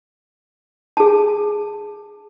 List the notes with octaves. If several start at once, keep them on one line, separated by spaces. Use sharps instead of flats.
G#4 A5